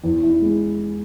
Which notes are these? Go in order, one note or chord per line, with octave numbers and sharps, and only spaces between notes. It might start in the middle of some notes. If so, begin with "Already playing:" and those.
E2
E4
G#3